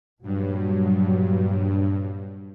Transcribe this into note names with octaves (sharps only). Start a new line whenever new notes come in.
G2 A#2 F#3 G3